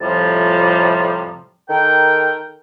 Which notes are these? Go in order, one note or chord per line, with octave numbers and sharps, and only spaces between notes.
F2 A2 C3 F3 G3 A5
D#3 A4 A#4 G5